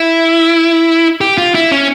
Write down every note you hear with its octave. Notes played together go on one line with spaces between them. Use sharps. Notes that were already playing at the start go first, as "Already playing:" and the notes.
Already playing: E4
G4
F4
E4
C#4